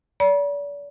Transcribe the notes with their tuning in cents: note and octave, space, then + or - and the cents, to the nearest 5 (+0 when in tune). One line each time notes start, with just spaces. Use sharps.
D5 -40 B5 -45